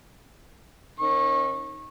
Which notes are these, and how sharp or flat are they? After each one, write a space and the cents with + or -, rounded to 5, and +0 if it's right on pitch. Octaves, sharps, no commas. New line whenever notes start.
D#3 +0 C#4 -40 C#6 -20